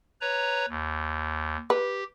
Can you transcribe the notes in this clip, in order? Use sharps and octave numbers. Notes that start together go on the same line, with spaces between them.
B4 C#5 A#5
D#2
G4 B4